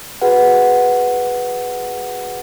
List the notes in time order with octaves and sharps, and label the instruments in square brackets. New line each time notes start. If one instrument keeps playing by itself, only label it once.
[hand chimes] F#4 G#4 B4 F#5